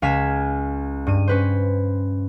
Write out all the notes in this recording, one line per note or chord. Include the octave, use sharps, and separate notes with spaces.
C#2 F5 G#5 B6 E7
G2 D#7
C#4 B4 C5